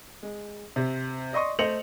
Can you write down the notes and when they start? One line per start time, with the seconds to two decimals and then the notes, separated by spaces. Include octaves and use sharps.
0.23 G#3
0.76 C3
1.33 D5 D#5 C6 C#6 D#6
1.59 A3 C5 D#5 C#7 F7 F#7